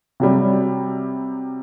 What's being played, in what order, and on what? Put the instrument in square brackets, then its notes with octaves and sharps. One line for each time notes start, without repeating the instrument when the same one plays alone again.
[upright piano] C3 F#3 G3